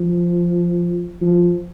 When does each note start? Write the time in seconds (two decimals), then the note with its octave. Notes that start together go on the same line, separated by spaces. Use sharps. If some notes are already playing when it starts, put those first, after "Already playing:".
Already playing: F3
1.21 F3